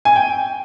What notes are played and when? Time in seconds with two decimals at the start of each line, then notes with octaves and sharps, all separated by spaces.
0.05 G#5
0.16 G5